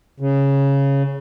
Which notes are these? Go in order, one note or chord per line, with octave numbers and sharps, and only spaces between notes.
C#3